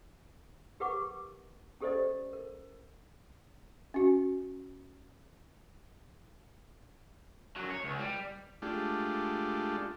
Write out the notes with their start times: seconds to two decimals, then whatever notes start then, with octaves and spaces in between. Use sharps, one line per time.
0.80 G4 A#4 B4 F#5 C#6 D6
1.81 C#4 G4 A4 C5 D5 D#5
2.33 A#4
3.94 C#4 F#4
7.56 F#2 F#3
7.70 C#5
7.84 C#2
7.99 G3
8.62 G#3 A3 D4 F4 G4